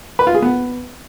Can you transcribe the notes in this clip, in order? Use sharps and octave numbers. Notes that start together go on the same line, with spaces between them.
B4
F4
G#4
B3